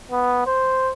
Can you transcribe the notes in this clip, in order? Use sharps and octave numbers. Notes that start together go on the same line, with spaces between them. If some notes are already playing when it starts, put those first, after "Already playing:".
B3
C5